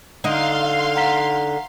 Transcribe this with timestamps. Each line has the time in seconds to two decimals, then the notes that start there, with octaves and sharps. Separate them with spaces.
0.24 D3 D#4 F5 C6
0.96 F#5 A#5 B6